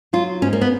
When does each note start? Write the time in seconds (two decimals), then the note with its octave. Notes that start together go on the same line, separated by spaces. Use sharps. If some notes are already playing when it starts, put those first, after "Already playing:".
0.13 F#3 F4
0.42 G#2 C#4
0.53 A#3
0.61 B3